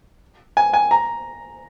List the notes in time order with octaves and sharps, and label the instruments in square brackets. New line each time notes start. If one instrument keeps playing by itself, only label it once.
[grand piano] G#5
G#5
A#5